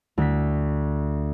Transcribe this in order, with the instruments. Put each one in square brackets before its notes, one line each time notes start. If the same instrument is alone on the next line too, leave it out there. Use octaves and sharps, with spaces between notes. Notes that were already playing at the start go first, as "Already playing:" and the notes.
[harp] D2 B6